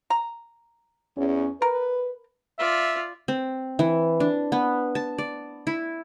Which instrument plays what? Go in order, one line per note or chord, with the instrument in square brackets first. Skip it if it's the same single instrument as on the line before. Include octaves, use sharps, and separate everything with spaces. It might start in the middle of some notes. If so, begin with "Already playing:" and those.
[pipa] A#5
[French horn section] E2 C#4
[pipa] A#4 [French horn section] B4
[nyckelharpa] F4 D5 [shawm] E5
[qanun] C4
E3
D4
B3
A5
D5
E4